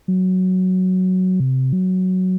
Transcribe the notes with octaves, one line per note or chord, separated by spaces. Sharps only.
F#3
C3
F#3